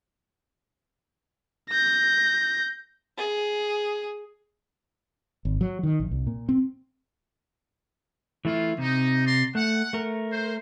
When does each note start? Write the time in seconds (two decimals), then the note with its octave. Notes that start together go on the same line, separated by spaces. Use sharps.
1.70 G6 A#6
3.18 G#4
5.45 G#1
5.61 F#3
5.83 D#3
6.00 A#1
6.11 C2
6.27 A#2
6.49 C4
8.45 E3 A3 E4 F4
8.78 C3 D#4
9.25 D5 A#5 C6
9.55 A3 F#5
9.93 A3 A#4
10.30 C5